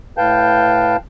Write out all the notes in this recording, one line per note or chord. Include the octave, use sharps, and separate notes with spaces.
A2 B4 F5 G5 A5 G6